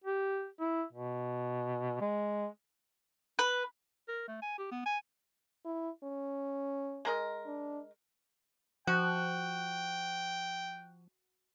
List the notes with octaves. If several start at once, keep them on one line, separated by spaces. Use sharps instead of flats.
G4
E4
B2
G#3
B4
A#4
A3
G#5
G4
B3
G#5
E4
C#4
G#3 A#4 D#5
D4
F3 F#4 G5 F#6